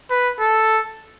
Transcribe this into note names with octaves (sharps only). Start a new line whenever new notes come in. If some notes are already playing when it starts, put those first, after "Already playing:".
B4
A4